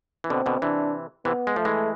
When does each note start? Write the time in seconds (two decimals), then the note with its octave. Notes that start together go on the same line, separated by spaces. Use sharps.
0.24 E3
0.30 B2 D3 C4
0.46 B2 D3
0.62 C3 E3 D4
1.25 C3 E3 B3
1.47 G#3
1.56 F3 A3
1.65 E3 G#3